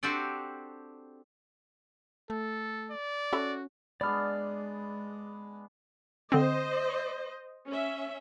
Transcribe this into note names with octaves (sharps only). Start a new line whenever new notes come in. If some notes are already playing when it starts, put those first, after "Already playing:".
C4 D4 F#4 G4 A4 D5
A3 A4
D5
C#4 F#4 A4 E5 B5
G#3 B3 D4 G#4 D5 F6
D3 C4 C5 D#5
C#4 E5